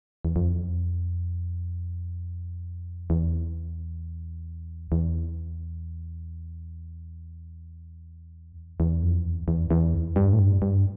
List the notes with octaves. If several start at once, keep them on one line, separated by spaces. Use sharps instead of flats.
E2
F2
E2
E2
F2
E2
E2
F2
E2
E2
E2
G2
A2
G2
G2